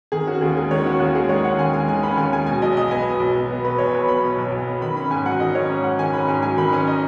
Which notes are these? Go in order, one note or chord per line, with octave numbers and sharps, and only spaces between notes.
D#3 G#4
C#4 F#4
D#2 G#4
G#3 G#4
D#3 C#5
C#4 F#4
D#2 F#4
G#3 G#4
D#3 C#5
C#4 F#5
D#2 G#5
G#3 G#5
D#3 G#5
C#4 B5
D#2 G#5
G#3 G#5
B2 G#5
B1 D#5
B1 D#5
B3 G#5
B2
B1
B1
B3
B2 B4
B1 C#5
B1 B4
B3 B5
B2
B1
B1
B3
D#3 B5
C#4 B5
G#2 G#5
F#3 F#5
D#3 D#5
C#4 C#5
G#2
F#3 F#5
D#3 G#5
C#4 B5
G#2 G#5
F#3 G#5
D#3 B5
C#4 G#5
D#5